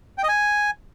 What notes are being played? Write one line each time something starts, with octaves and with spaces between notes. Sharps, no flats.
G5
D#5
G#5